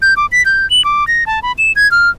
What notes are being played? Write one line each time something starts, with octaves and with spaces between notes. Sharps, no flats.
G6
D6
B6
G6
F#7
D6
A#6
A5
B5
E7
G#6
F6